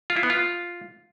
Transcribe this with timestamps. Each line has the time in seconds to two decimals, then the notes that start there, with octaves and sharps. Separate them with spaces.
0.10 F4
0.17 E4
0.23 B3
0.30 F4